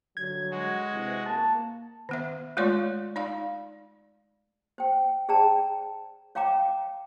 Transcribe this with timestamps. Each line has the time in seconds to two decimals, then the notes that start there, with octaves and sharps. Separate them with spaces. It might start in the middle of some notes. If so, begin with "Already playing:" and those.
0.17 G2 D3 F#3 G#6
0.51 G#3 F#4
0.92 C3 E3
1.26 A#3 A5
2.09 D#3 B3 E5
2.57 G#3 A3 F4 C#5 D5 C6
3.16 D#4 D5 F5
4.78 C5 G5
5.29 G#4 C5 D5 G5 A5 A#5
6.35 C#5 F5 G5 A#5 D6